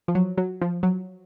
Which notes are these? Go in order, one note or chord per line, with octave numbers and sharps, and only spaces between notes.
F3
F#3
F#3
F3
F#3